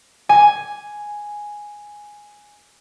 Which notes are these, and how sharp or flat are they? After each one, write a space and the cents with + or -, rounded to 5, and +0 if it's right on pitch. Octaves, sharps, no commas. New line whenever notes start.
G#5 +0 D6 +0